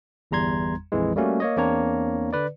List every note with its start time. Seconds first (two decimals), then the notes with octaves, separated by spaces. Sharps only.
0.31 G1 E2 G3 A#5 C6 G#6
0.92 A#1 F2 E3 G#3
1.16 G3 A3 A#3 C#4 F#4
1.40 A#3 C#5 D#5
1.57 E2 A#3 C4 D4 C#5 A#5
2.33 D3 B4 D5